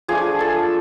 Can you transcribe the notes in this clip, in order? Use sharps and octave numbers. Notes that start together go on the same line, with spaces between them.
F3 A3 D4 G#4
A4